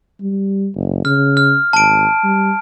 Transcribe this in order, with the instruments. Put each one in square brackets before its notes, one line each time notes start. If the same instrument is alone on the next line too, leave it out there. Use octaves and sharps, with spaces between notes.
[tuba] G3
F#1
[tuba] C#3 [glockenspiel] F6
[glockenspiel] F6
[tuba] G#1 [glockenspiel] A5 D7
[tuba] G3